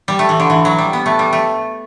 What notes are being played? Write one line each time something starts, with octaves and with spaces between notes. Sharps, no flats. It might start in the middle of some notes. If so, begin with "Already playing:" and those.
G3
A3
E3
D3
E3
F#3
G3
B3
A3
G3
A3